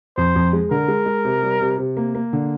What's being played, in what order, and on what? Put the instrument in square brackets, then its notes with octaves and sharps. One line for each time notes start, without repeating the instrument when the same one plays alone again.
[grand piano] F2 [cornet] C5
[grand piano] F2
G#3
[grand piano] D3 [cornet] A#4
[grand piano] G#3
G#3
C3
G3
C3
C3
A#3
A#3
D3